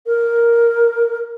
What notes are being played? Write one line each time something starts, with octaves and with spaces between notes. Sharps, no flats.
A#4